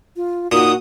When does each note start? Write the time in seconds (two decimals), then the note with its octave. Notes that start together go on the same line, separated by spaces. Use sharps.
0.16 F4
0.52 A#2 D#4 F#4 D#6